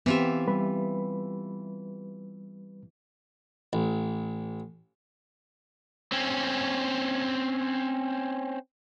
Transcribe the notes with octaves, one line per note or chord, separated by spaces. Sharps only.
E3 B3 C4 F4 G4 E5
G3 B4 B5
A1
C4 C#4